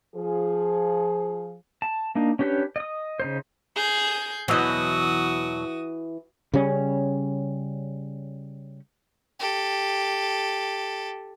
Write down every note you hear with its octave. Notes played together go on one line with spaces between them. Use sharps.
F3 G#4
A5
A#3 D4 D#4
C#4 D4 G4 B4 C#5
D#5 D#6
C#3 D#4 C5
G#4 G6
E2 B2 E3 F#3 F#4 D#5 D#6
C#3 G3 C#4
G4 A4